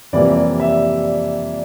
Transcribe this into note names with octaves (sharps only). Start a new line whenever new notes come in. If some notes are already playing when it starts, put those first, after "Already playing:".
F2 C3 E3 G3 A#3 D5
D5
E5